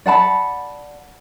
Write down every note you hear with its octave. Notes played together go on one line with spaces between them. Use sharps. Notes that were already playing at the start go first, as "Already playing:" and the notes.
D5 F#5 A5 B5